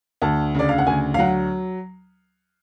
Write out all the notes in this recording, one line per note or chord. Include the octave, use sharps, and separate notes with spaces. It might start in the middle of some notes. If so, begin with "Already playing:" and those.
D2 A5
C#3 D5
F5
F#5
D2 G#5
F5
F#3 F#5